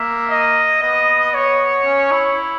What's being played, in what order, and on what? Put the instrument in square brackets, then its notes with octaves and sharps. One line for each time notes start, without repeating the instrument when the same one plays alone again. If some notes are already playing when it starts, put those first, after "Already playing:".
Already playing: [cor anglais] A#3 [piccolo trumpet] E5
[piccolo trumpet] D#5
[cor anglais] B3 [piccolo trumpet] D#5
[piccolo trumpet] C#5
[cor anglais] C#4
E4